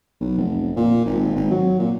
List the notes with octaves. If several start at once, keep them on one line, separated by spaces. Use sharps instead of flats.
B1
F1
A#2
G#1
G#1
F#3
A#2